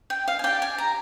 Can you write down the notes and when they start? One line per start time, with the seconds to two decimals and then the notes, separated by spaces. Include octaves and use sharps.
0.10 G5
0.28 F5
0.39 G#5
0.44 G4 D5 G5
0.62 G#5
0.78 A#5